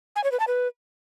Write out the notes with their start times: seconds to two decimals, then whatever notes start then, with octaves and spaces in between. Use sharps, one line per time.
0.16 G#5
0.24 C#5
0.32 B4
0.40 A5
0.48 B4